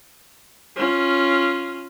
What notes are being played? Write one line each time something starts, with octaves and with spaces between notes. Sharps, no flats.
C#4 F4